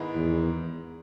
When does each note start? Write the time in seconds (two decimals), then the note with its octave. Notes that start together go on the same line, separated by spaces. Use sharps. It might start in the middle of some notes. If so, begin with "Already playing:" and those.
Already playing: G#2 D#3 G#3 B3 E4
0.15 E2